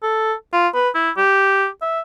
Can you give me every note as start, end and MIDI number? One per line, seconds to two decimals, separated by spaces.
0.03 0.33 69
0.53 0.68 65
0.74 0.89 71
0.95 1.10 64
1.17 1.67 67
1.82 2.00 76